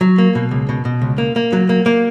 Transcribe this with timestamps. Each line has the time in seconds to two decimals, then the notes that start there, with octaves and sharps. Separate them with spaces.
0.01 F#3
0.18 A#3
0.35 B2
0.51 C#2
0.69 B2
0.85 B2
1.02 C#2
1.18 A#3
1.36 A#3
1.53 F#3
1.69 A#3
1.86 A#3